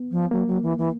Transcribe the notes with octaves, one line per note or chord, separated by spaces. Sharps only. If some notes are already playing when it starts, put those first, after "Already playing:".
Already playing: B3
F3
F#3 A#3
F#3
E3
E3